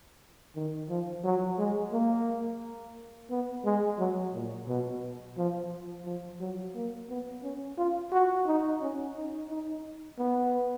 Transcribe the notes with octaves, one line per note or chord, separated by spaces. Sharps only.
D#3
F3
F#3
G#3
A#3
B3
G#3
F#3
A#2
B2
F3
F3
F#3
A#3
B3
C#4
F4
F#4
D#4
C#4
D#4
D#4
B3